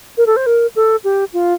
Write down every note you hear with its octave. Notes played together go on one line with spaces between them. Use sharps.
A#4
A4
C5
A#4
A4
G4
F4